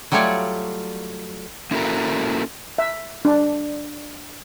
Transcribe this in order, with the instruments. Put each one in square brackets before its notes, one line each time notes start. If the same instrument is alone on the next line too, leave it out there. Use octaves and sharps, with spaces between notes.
[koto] F#3 G3 A3 F4 C#5 D5
[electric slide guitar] A#3 C#4 E4 F#4 A4 A#4
[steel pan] E5
D4